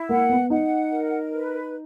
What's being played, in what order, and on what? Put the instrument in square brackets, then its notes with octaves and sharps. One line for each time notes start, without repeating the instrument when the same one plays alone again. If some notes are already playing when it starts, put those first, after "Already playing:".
Already playing: [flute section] E4
[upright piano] A#3 [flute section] F#5
[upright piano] B3
[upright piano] D#4 [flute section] F#5
[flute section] A#4
B4